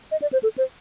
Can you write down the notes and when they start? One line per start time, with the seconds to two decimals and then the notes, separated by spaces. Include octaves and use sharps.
0.12 D#5
0.22 D5
0.33 C5
0.43 A4
0.58 C5